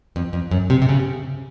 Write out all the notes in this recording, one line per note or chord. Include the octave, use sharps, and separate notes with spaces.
F2
F2
F#2
C3
C3
C#3